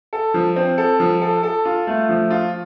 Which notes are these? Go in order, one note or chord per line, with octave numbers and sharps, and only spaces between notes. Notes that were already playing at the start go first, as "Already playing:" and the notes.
A4
F3
C4
A4
F3
A4
A4
F4
A3
F3
F4